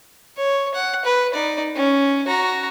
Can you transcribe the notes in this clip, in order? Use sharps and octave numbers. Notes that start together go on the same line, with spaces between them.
C#5
F#5
B4
D#4 D5
C#4
F#4 A#5